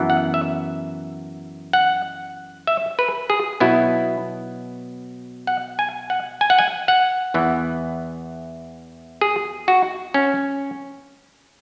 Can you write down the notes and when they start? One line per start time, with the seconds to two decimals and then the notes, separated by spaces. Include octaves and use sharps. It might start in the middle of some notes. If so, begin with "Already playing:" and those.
Already playing: F#2 E3 B3
0.10 F#5
0.34 E5
1.73 F#5
2.67 E5
2.99 B4
3.30 G#4
3.60 B2 F#3 B3 E4
5.47 F#5
5.79 G#5
6.10 F#5
6.41 G#5
6.50 F#5
6.59 G#5
6.88 F#5
7.34 E2 E3 B3
9.21 G#4
9.68 F#4
10.14 C#4